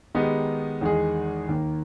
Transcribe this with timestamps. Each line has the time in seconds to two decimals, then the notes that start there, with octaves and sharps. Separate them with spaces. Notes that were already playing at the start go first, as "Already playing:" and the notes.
0.15 D#3 G#3 B3 D#4 G4
0.81 E2 D#3 G#3 D#4 G#4
1.48 D#2 D#3 A#3